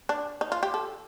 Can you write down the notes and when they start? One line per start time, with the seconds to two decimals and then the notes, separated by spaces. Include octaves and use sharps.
0.09 D4
0.41 D#4
0.52 F4
0.63 G4
0.74 A4